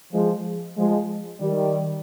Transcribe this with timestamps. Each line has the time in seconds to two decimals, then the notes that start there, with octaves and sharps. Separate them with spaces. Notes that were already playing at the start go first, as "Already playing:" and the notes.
0.13 F3 G#3
0.77 F3 G#3
1.41 D#3 G3